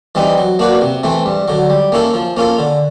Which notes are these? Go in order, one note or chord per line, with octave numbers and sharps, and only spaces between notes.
E3 G3 C4 D#4
F#3
A#3 D4 F#4 B4
C3
E3 A3 C4
G2
D3 F#3
G3
A#3 C#4 E4 A4
F3
A#3 C#4 F4 A4
D3